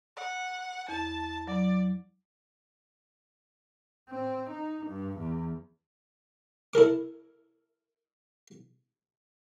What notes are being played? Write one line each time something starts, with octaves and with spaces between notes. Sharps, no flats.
F#5
E2 A5
F#3 D5
C4
D#4
G2
E2
E4 A4 A#4 D6